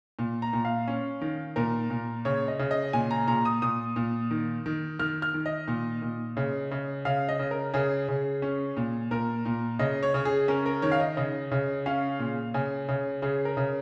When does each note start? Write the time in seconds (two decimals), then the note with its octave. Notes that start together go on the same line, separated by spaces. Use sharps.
0.19 A#2
0.42 A#5
0.53 A#2
0.65 F5
0.88 C#4
1.21 D#3
1.56 A#2 A#4
1.90 A#2
2.25 C#3 C#5
2.48 D#5
2.59 C#3
2.71 D#5
2.93 A#2 G#5
3.11 A#5
3.27 A#2 A#5
3.45 D#6
3.62 A#2 D#6
3.96 A#2
4.31 D#3
4.66 D#3
4.99 D#3 F6
5.22 F6
5.34 D#3
5.46 D#5
5.68 A#2
6.02 A#2
6.37 C#3
6.71 C#3
7.05 C#3 F5
7.29 D#5
7.39 C#3
7.51 A#4
7.74 C#3 G#4
8.08 C#3
8.42 C#4
8.77 A#2
9.11 A#2 A#4
9.45 A#2
9.79 C#3 D#5
10.03 C#5
10.14 C#3
10.25 G#4
10.48 C#4 A#4
10.66 A#4
10.82 D#3 C#5
10.92 F5
11.00 D#5
11.17 C#3 D#5
11.51 C#3
11.86 C#4 F5
12.19 A#2
12.54 C#3 G#5
12.89 C#3
13.22 C#3 G#4
13.45 A#4
13.57 C#3